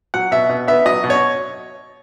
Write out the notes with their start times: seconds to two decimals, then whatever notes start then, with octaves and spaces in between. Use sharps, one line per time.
0.14 F#3 F#5
0.31 B2 E5
0.49 B2
0.67 B3 E5
0.86 F#3 D#5
1.04 B2
1.10 C#5